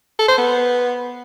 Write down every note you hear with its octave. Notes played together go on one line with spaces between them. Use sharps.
A4
C5
B3